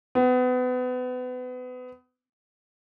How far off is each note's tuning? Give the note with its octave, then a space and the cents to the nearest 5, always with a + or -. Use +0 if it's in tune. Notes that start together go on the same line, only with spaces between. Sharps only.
B3 +30